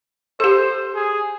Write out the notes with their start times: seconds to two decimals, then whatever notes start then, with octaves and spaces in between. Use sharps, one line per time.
0.40 G4 A4 C5
0.95 G#4